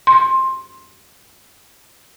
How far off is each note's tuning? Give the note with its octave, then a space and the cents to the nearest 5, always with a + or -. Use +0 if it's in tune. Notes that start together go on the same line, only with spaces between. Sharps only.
C6 +15